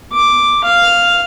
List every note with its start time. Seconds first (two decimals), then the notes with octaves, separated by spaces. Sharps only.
0.12 D6
0.64 F5